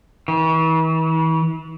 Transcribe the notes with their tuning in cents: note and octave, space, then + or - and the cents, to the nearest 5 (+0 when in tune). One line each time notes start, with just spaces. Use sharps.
E3 -40